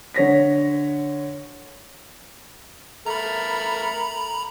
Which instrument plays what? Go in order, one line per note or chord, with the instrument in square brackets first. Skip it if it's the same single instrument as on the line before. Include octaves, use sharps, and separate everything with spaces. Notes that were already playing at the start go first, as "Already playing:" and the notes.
[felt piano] D3 C#5 A#6 B6
[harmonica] A3 A#4 [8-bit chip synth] A#5 B5